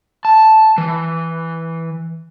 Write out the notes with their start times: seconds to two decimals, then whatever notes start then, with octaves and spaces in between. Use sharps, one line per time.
0.25 A5
0.78 E3